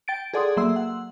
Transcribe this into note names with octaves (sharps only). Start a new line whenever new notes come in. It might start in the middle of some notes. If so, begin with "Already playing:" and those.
G5 A6 D7
G#4 A4 D5 F#5 C6 D#6
F#3 A#3 E5 C6 E6
F#5